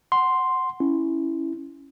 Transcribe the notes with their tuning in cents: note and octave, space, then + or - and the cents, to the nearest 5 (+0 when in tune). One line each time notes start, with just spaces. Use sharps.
F#5 +0 C6 +0
C#4 +0 E4 +0